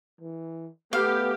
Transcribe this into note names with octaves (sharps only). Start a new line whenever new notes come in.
E3
A3 B3 G4 F5